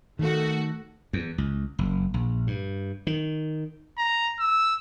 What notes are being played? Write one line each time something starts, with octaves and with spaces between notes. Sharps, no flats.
D#3 A3 F#4
E2
C#2
F#1
A#1
G2
D#3
A#5
E6